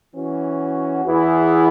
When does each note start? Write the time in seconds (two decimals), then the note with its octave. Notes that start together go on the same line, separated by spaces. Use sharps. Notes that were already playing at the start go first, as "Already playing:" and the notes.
0.14 E3 C#4 F#4
1.03 E2 E3 B3 E4 G#4